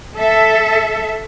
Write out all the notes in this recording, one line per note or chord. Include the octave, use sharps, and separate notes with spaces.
A4 E5